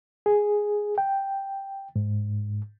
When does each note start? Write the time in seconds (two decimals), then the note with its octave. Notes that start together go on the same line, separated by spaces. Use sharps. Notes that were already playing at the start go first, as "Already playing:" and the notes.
0.26 G#4
0.98 G5
1.96 G#2